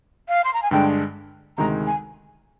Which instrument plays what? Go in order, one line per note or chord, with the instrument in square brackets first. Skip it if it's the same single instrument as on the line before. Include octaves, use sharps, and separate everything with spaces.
[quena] F5
C6
A#5
G#5
[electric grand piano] G2 D3 G#3 D4 [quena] G5
[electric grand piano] D2 C3 D#3 G#3 [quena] A#5
[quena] G#5